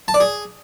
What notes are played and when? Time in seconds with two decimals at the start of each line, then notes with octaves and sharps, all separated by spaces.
0.08 A5
0.14 D5
0.20 G#4